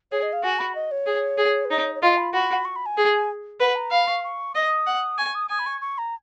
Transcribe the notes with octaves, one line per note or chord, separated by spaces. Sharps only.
G#4 C#5
D#5
F5
F#4 G#5
B5
D#5
C#5
G#4
G#4
B4
D#4 C#5
C#5
F4 D#5
B5
F#4 B5
C#6
B5
G#5
G#4
B4 F#5
A#5
F5 B5
C#6
C#6
D#5 D#6
F#5
G#5 C#6
D#6
G#5 D#6
B5
C#6
C#6
A#5